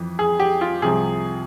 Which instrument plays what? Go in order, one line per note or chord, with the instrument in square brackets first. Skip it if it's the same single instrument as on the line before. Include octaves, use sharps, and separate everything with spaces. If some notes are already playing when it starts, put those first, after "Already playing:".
Already playing: [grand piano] F2 E3
G#4
G4
F4
C2 C3 F3 G#4